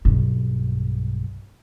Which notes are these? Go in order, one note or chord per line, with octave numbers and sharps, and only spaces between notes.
B1 G2